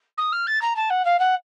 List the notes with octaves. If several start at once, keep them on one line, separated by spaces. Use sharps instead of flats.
D#6
F6
A6
A#5
A5
F#5
F5
F#5